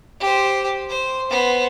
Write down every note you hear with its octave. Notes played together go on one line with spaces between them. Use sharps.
G4 C5
C5
B3 C5